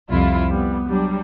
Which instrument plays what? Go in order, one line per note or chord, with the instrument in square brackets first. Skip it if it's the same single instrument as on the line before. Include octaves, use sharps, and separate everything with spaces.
[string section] C2 F2 E4 F4
G3 B3
F#3 G3 D4